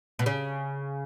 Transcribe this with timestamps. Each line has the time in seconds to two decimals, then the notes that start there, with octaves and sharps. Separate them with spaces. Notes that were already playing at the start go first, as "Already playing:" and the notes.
0.19 B2
0.26 C#3